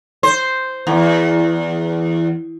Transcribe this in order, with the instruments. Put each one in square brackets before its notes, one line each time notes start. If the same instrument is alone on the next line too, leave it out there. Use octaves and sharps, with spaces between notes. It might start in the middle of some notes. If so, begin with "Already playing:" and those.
[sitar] C5
E2